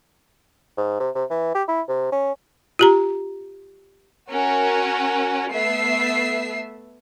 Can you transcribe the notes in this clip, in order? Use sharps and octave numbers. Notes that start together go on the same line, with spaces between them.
G#2
C3
C3
E3
G4
E4
C3
C#4
F4 G4 A#5
C#4 F#4 A#4
A3 B3 E5 C7